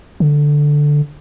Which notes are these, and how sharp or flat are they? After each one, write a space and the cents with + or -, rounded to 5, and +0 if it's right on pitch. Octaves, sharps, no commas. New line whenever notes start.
D3 +0